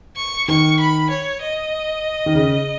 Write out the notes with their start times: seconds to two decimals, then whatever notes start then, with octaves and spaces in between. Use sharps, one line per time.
0.17 C#6
0.48 D#3 C#6
0.80 B5
1.10 C#5
1.41 D#5
2.26 D#3
2.35 C#3